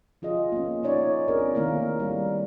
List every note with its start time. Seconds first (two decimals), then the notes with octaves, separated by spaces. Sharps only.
0.22 F3 F4 G#4 D#5
0.52 A#3 C#4
0.83 C#4 D#4 C#5 D5
1.28 C4 D4 G#4 A#4
1.55 D#3 A3 A#3 E4 A#4
2.00 G3